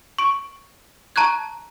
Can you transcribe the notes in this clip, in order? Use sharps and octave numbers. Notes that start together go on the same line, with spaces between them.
C#6 D7
A5 A#5 C#6 F#6 G#6